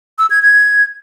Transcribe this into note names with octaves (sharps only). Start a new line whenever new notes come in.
E6
G#6
G#6